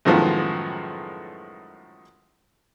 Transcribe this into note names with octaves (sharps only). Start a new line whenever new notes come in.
F#2 A2 D#3 F3 G#3 B3